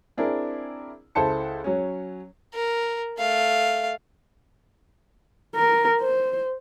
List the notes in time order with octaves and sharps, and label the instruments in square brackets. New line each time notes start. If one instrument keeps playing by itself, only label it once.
[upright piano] C4 D4 E4 G#4 A#4
C#2 E4 A4 C5 A5 C#7
F#3 C#4
[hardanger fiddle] A#4
A3 F5
[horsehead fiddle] A#4
C5